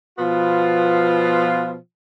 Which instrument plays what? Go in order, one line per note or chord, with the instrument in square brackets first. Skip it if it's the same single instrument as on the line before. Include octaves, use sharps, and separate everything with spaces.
[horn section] B2 F3 B3 F4